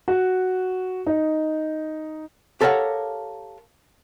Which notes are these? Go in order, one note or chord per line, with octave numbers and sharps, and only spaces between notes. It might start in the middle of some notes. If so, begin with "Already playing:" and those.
F#4
D#4
G4 A4 A#4 C#5 F5 F#5